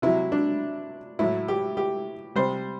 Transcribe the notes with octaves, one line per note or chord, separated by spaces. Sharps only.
C3 F#3 E4
D4
A2 F#3 E4
G4
G4
C3 G3 C5